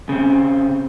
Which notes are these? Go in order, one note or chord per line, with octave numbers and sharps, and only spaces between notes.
C#3 C4